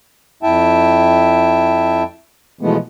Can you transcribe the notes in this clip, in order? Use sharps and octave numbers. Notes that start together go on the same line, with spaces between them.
F2 E4 E5 G5 A5
B2 E3 F3 G#3 A3 B3